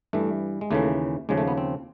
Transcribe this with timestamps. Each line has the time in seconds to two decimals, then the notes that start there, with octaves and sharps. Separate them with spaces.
0.13 G2 E3 A3
0.61 G#3
0.71 D#2 C#3 E3 A3
1.29 D#2 C#3 F3 G#3
1.38 A3
1.48 B3
1.58 C4